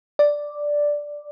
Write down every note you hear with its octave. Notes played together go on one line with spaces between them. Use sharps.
D5